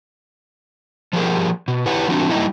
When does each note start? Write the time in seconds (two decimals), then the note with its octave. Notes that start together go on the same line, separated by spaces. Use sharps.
1.13 F3 G3 A#3 G4 G#4 A#4
1.68 B2
1.86 E4 G4 B4 C#5 F#5
2.08 F3 A3 C4 D4 F#4
2.30 G3 A#3 C4 D#4 E4